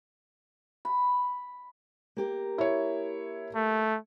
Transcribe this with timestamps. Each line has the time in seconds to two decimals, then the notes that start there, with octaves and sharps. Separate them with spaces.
0.85 B5
2.17 A#3 G4 A#4
2.58 E4 C#5
3.55 A3